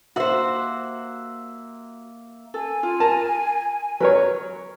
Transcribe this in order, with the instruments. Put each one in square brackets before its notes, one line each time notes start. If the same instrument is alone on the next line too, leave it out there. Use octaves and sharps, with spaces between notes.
[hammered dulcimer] A#3 E5 [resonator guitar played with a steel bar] F#4 C5
[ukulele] A4 [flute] G#5
[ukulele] F4
[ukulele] A#4 [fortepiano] A5
[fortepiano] F#3 A#4 C#5 [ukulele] B4